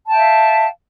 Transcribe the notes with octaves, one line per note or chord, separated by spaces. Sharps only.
E5 F5 G5 A5